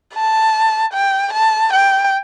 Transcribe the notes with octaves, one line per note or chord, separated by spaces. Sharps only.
A5
G5
A5
G5